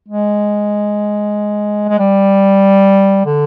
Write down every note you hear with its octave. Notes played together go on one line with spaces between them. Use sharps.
G#3
G#3
G3
D3